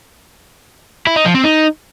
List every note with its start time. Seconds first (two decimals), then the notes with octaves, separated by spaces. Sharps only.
1.07 E4
1.16 D#4
1.25 F3
1.35 C4
1.44 D#4